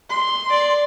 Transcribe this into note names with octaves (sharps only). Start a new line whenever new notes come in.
C6
D5